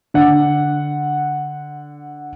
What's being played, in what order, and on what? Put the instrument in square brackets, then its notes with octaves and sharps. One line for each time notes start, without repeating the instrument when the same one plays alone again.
[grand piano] D3 F#5